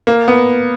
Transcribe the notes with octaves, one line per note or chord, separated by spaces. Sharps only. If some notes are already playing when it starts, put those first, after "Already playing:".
A#3
B3